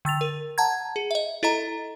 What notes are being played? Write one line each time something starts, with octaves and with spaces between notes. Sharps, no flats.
D3 E6 A6 F7
A#4
F#5 A5 A#5 G#6
G#4
D#5 E5
E4 A4 D#5 A#5